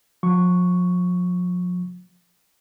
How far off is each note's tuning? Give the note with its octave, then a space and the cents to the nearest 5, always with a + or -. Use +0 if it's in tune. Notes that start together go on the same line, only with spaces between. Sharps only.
F3 +40 C#6 +0